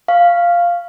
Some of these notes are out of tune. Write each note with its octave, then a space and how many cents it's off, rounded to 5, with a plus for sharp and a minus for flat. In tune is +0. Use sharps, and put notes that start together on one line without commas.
F5 -5 C#6 +0